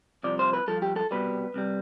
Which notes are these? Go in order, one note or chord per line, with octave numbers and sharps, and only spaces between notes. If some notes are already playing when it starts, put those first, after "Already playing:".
C2 C3 F3 D5
C5
B4
G2 F3 A4
G4
A4
C2 B2 G3 B4
C2 C3 G3